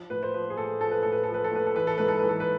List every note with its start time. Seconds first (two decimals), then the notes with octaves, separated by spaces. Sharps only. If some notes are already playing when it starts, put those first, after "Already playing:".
Already playing: F3
0.10 A2 B4
0.23 C5
0.34 F3 B4
0.50 G#4
0.57 A2 A4
0.81 F3 A4
0.91 B4
1.03 A2 A4
1.12 B4
1.23 A4
1.29 F3
1.34 B4
1.44 A4
1.51 A2 B4
1.66 A4
1.75 E3 B4
1.87 A4
1.98 G#2 B4
2.08 A4
2.19 E3 B4
2.29 A4
2.40 B4